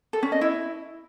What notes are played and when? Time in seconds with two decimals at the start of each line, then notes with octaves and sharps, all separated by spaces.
0.13 A4
0.23 C#4
0.32 D#5
0.41 E4